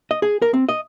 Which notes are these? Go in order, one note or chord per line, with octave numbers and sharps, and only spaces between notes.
D#5
G#4
A#4
C4
D#5